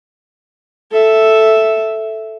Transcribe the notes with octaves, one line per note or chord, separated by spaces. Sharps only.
A4 E5